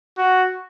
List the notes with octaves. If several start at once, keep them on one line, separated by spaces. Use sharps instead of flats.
F#4